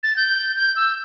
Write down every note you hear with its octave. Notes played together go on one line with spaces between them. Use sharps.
A6
G6
G6
E6